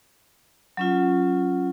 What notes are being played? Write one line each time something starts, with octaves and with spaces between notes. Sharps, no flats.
F#3 C#4 F4